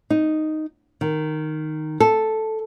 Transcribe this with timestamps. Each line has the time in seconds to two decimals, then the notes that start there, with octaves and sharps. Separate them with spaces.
0.10 D#4
1.01 D#3
2.00 A4